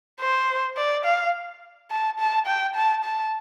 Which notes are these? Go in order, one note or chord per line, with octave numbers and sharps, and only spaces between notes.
C5
D5
F5
A5
A5
G5
A5
A5